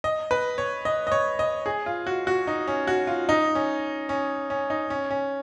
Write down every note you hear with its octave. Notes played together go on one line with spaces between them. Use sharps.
D#5
B4
C#5
D#5
D#5
C#5
D#5
G#4
F4
F#4
F#4
D#4
C#4
F#4
F4
D#4
C#4
C#4
C#4
D#4
C#4
C#4